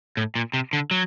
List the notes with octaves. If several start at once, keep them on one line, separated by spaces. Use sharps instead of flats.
A2
A#2
C3
D3
F#3